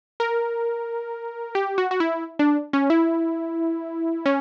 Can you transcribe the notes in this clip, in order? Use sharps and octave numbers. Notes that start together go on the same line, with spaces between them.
A#4
G4
F#4
F#4
E4
D4
C#4
E4
C#4